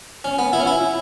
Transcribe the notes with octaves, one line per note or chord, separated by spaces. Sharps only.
C#4
B3
E4
C#4
E4